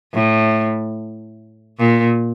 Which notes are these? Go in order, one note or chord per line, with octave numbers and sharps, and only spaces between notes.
A2
A#2